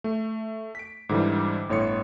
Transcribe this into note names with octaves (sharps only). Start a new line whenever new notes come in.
A3
B6 D7
G#2 D3 E3 G3
G1 A2 C#5 C6 C#7